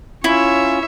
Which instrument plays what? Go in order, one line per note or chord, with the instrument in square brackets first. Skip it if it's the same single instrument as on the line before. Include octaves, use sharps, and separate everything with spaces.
[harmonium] C#4 F4 [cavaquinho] E4 [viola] C#5 E5